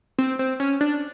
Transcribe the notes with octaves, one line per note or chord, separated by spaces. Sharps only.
C4
C4
C#4
D4